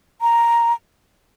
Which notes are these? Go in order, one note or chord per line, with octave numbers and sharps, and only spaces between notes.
A#5